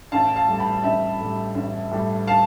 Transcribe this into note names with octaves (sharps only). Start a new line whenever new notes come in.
A1 F5 A5
F5 A5
A2 G3
A5
G5 B5
A1 E5 G5
A2 G3
A1
A2 G3
F5 A5